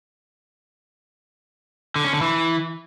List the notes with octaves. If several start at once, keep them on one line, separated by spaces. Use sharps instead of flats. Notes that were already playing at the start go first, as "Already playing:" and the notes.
D3
C#4
D3
E3